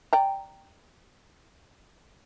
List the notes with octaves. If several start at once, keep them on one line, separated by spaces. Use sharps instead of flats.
D5 G5 A#5